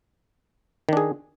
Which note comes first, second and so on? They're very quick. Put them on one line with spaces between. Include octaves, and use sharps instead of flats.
D#3 D4 G#4